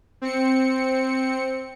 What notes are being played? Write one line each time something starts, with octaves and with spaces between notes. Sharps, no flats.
C4 C#7